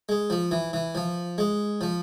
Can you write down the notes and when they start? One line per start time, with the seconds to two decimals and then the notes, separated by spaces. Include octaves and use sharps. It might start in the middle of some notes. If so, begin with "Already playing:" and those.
0.09 G#3
0.30 F3
0.51 E3
0.73 E3
0.95 F3
1.38 G#3
1.81 F3